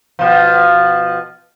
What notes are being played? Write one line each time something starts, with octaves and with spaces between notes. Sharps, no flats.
B2 F3